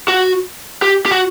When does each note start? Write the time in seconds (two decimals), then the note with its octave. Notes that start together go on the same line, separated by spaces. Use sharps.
0.08 F#4
0.82 G4
1.06 G4
1.12 F#4